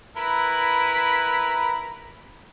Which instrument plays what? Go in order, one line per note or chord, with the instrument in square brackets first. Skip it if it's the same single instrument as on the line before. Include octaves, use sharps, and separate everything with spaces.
[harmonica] E4 A#4 B4